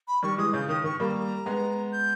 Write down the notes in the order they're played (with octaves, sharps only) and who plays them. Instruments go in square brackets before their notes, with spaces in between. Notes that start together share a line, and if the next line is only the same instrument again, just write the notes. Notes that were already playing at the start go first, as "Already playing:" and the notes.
[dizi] B5
[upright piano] D#3 G3 [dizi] C#6
[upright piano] E3 G#3 [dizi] D#6
[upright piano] C#3 [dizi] G6
[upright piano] D#3 [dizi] D#6
[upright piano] D#3 [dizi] C#6
[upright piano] G3 A#3 [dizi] A#5 B5
[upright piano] G#3 B3
[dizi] G6